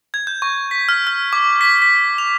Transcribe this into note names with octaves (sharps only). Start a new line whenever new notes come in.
G#6
G6
C#6
B6
F6
F6
D6
B6
B6
F7